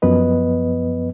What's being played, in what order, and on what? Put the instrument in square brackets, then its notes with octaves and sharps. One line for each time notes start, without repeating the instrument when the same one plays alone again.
[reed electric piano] F#2 F3 B3 B4 D#5